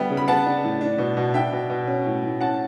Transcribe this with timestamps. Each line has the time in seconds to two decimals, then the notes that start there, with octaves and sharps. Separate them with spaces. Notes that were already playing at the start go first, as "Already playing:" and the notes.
Already playing: D3 G3 B3 E5 G5
0.10 C#3
0.17 B5
0.28 B3 F#5 A5
0.46 D4
0.64 A2
0.81 D4
0.98 B2
1.17 B2
1.34 D4 E5 G5
1.52 B2
1.70 B2
1.87 C#4
2.06 A2
2.23 A2
2.41 C#4 F#5 A5